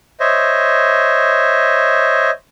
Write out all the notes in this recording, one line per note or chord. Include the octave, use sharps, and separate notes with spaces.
C5 C#5 D#5 E5